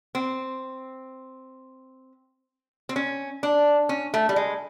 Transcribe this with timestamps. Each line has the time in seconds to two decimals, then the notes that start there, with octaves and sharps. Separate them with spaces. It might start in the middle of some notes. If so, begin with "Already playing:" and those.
0.15 C4
2.89 C4
2.96 C#4
3.43 D4
3.89 C#4
4.14 A3
4.29 G3
4.36 G#3